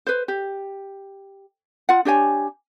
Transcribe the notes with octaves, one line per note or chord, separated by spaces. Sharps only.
B4 C5
G4
F4 F#5
D4 G4 C#5 G#5